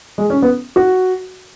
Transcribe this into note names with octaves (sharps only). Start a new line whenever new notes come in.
G#3
C#4
B3
F#4